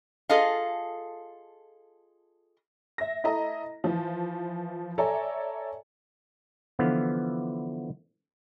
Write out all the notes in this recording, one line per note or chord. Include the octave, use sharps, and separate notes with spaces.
F4 G#4 A4 D#5 F5
E5 A#6
E4 A4 D#5 A#5
E3 F3
A4 C#5 D5 E5 G#5 A#5
D3 E3 F3 B3 F5